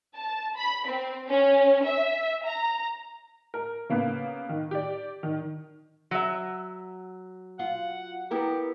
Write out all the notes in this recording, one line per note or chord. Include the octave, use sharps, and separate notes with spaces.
A5
B5
C4
C#4
E5
A#5
A#4
C#3 A#3 B3
D#3
G4 D5
D#3
F#3 E5
F4 F#5
B3 E4 G4 A#4